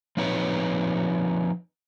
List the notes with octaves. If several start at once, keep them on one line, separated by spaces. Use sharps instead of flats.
F3 C4 D#4 B4 C#5